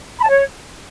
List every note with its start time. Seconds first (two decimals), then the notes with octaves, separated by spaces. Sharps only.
0.18 B5
0.23 A5
0.28 C#5